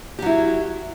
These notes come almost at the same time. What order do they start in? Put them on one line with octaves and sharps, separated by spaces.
G4 F#3 E4